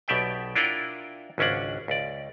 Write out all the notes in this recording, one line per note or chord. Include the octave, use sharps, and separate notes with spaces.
B1 B2 G4 D5 E5 G5
D4 E4 F4 A#4 F#5 G5
G#1 C#2 C#4 D4 F#5
C#2 D5